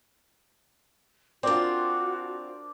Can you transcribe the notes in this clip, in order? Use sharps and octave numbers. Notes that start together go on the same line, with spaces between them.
C4 D4 F4 F#4 A#4 C5 D5